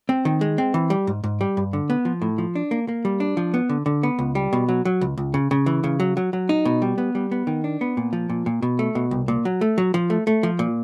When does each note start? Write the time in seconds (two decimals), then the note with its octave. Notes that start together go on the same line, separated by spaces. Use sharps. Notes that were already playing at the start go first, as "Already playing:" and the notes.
0.09 C4
0.25 D#3
0.41 G#3
0.58 C4
0.74 E3
0.90 G3
1.07 G#2
1.24 G#2
1.41 G3
1.57 G2
1.73 D3
1.90 B3
2.05 F3
2.22 A2
2.38 F3
2.55 D4
2.71 A#3
2.88 A#3
3.05 G3
3.20 D4
3.37 F3
3.54 B3
3.69 D3
3.86 D3
4.03 B3
4.19 C#2
4.35 G3
4.53 B2
4.69 F#3
4.85 F#3
5.01 C#2
5.18 C#2
5.34 C#3
5.51 C#3
5.66 E3
5.84 C#3
6.00 F#3
6.17 F#3
6.33 F#3
6.49 D#4
6.65 B2
6.82 G3
6.98 B3
7.15 G3
7.31 B3
7.47 D#3
7.64 D4
7.81 B3
7.97 A#2
8.13 F3
8.30 A#2
8.46 A#2
8.62 B2
8.79 A3
8.95 B2
9.11 C2
9.28 A#2
9.45 F#3
9.61 A3
9.78 F#3
9.94 F3
10.10 A3
10.27 A3
10.43 F3
10.59 A#2